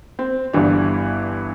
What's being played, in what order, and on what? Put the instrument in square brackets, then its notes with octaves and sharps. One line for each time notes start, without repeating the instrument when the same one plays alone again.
[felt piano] C4
G1 G2 E3 D4